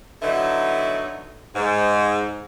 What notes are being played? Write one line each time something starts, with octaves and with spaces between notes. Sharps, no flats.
D3 F#3 B3 D#4 E4
G#2